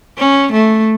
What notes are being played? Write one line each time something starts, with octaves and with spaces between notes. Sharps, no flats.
C#4
A3